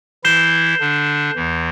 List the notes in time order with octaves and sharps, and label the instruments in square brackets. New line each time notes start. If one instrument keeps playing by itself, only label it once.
[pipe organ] E3 E4 [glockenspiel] G6 C7 E7 G7
[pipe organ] D3 D4
E2 E3